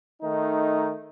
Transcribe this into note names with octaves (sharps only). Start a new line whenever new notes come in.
D#3 A3 D#4